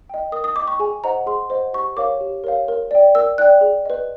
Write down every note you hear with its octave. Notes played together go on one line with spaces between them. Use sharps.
D#5 G5
A#4 D#6
D#6
D#5 G5 D6
C#6
G#4 G#5
C5 D#5 F#5 A#5
G#4 C6
C5 D#5 F#5
G4 C#6
A#4 C#5 F5 D6
G4
A#4 C#5 F5
A#4
D5 G5
A#4 E6
D5 G5 F#6
G#4
B4 D#5